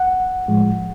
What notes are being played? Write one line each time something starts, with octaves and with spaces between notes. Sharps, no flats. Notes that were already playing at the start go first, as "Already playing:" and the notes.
Already playing: F#5
A2 F3 G#3